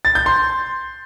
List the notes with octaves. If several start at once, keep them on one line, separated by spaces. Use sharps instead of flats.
A6
G6
C6